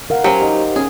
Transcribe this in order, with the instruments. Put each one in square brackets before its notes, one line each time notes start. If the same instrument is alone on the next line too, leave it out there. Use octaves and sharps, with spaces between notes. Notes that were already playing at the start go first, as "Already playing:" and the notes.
[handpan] A#4 F5 F#5
[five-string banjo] F#3 C#4 [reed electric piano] G4 C5
[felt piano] D#4
[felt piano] C#4 [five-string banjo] G#4